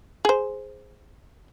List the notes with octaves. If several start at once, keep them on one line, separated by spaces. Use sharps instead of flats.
G#4 C5